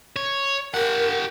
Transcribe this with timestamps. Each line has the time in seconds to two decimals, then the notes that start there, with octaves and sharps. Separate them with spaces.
0.16 C#5
0.74 G4 A#4 F#5